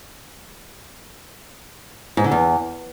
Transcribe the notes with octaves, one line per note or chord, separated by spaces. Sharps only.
G#2
D3
E2